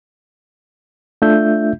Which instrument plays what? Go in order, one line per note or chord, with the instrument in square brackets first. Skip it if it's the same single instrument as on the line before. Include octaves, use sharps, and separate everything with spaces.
[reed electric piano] A3 D4 F4 E5 G6